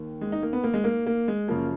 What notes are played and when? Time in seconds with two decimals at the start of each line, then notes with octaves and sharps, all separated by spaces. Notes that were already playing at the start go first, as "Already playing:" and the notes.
Already playing: D#2 D#3
0.21 G#3
0.32 D#4
0.42 A#3
0.53 B3
0.64 A#3
0.74 G#3
0.84 A#3
1.06 A#3
1.28 G#3
1.48 F#2 C#3 F3 A#3